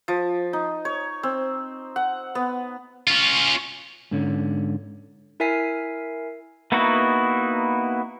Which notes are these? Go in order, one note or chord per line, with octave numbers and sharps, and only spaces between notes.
F3
D#4
C#5
C4
F#5
B3
C#4 F4
G#2 D3 C#4
E4 A#4 E5 G#5 B6 C7
A#3 B3 D#4 E4 F#4